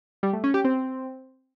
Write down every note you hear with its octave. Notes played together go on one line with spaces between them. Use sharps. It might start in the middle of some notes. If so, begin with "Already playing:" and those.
G3
A3
C#4
G4
C4